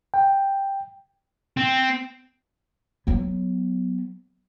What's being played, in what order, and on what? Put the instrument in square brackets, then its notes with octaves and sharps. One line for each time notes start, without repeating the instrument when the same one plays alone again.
[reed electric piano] G5
[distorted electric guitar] C4
[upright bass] F#3 B3